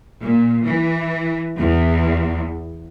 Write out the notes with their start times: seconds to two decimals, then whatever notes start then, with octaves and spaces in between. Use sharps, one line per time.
0.21 A#2
0.65 E3
1.58 E2